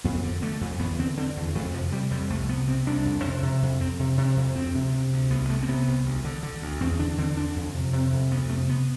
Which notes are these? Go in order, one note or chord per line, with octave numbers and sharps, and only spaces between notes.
F2 B3
D3
D3 A3
F2
E2 B3
D3 C4
D3 C4
E2
F2 A3
C3 F3
C3 G3
F2 G3
C2 A3
C3 B3
C3 C4
C2 D4
F2
C3
C3
F2
F2 C4
C3
C3
F2
D2 C4
C3
C3
D2
C2 B3
C3 A3
C4
C3 B3
C2
D2
D3
D3
D2
E2 C4
D3 D4
D3 C4
E2 D4
F2
C3
C3 C4
F2
D2 B3
C3 A3
C3 B3